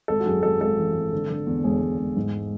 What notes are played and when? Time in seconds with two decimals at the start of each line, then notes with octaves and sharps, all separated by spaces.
0.08 G#1 A4
0.20 F#4
0.26 F#2 G#4
0.43 G#1 A4
0.61 G#1 A4
0.79 E3
0.95 G#1
1.13 D3
1.30 D3
1.47 E2
1.64 E1 G#4
1.82 E1
1.98 E1
2.17 G#2